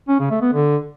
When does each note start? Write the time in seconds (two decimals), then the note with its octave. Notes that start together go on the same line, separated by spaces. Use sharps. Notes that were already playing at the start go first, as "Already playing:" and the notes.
0.08 C#4
0.19 C#3
0.31 A3
0.42 B3
0.53 D3